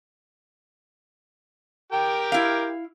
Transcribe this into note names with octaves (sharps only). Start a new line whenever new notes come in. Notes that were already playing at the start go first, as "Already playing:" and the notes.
G4 A#4 G5
E4 F5